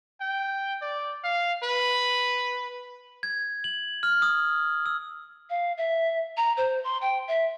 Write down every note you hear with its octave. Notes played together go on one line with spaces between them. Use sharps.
G5
D5
F5
B4
G#6
F#7
F6
D#6
E6
F5
E5
A#5
C5
C6
G5
E5